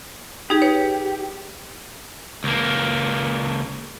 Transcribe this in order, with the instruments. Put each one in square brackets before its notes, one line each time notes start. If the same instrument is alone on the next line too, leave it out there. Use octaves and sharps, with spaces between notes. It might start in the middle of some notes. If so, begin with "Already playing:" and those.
[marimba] D#4 G#4 [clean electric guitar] G4
[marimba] B4 C#5
[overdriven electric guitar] C#2 A#3